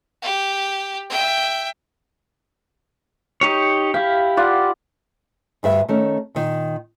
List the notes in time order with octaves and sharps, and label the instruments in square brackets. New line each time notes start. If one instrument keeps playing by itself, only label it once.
[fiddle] G4
E5 G5
[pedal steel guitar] D#4 G4 C#5
[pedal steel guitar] E4 G4 [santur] F5
[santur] F4 D5 F#5
[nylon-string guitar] D2 G2 E5
D#3 A3 C#4
A#2 D#3